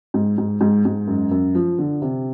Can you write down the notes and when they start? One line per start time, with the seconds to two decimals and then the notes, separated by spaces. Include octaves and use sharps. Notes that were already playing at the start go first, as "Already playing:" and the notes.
0.14 G#2
0.38 G#2
0.61 G#2
0.85 G#2
1.07 F#2
1.31 F#2
1.55 F3
1.79 D3
2.02 C3